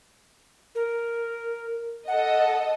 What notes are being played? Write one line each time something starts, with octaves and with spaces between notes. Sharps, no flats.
A#4
A4 D#5 F#5